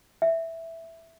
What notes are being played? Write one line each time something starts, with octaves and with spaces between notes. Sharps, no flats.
E5